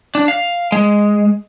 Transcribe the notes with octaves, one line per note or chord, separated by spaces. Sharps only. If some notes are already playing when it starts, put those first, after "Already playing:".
D4
F5
G#3